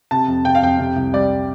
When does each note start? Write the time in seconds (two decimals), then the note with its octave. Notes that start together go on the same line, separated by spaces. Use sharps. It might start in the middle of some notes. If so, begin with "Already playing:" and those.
0.11 C3 A5
0.28 F2
0.45 C3 G5
0.55 F5
0.62 F2 G5
0.79 C3
0.96 C2
1.13 G3 D5